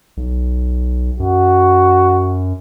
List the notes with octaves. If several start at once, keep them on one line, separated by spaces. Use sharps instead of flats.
B1
F#2 F#4